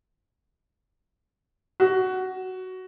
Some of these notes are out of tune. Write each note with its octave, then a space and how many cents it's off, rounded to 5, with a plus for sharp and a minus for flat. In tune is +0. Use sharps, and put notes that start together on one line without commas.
F#4 +10